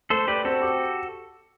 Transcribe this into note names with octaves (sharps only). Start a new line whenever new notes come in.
A3 A4 C5
G4 B4 D5
C4 F#4 A4
G4